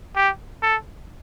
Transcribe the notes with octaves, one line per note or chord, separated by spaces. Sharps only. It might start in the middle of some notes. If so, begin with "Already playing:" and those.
G4
A4